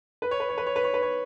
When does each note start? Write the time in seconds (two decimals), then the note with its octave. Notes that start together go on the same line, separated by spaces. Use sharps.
0.22 B4
0.31 C#5
0.40 B4
0.49 C#5
0.58 B4
0.66 C#5
0.76 B4
0.84 C#5
0.94 B4
1.02 C#5